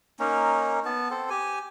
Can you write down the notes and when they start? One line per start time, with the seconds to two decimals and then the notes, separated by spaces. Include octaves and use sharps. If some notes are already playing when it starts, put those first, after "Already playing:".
0.20 A#3 C#4 D#4
0.85 B3 A5
1.10 C4 A4 C5
1.30 G4 G#5